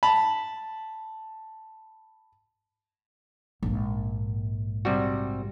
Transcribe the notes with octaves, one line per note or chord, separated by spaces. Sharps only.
A5 B5
A#1 G#2
C3 G3 F#4